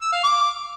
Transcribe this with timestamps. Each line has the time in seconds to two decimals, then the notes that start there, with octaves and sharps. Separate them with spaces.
0.01 E6
0.12 F5
0.23 D6